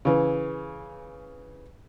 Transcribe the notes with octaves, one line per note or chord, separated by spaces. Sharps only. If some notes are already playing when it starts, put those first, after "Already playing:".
C#3 E3